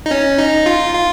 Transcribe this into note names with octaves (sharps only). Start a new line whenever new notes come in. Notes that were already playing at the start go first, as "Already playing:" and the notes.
D#4
C#4
D#4
F4
F4